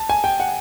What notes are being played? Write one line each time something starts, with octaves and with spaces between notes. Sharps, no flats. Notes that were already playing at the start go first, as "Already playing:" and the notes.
Already playing: A5
G#5
G5
F#5